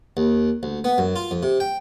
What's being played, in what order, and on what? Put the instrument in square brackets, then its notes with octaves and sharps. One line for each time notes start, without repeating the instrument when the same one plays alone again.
[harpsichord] D#2
D2
B3
F#2
F4
F2
C3
G5